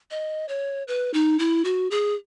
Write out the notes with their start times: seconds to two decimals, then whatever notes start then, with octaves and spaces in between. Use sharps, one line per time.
0.11 D#5
0.49 C#5
0.88 B4
1.14 D#4
1.39 E4
1.65 F#4
1.91 G#4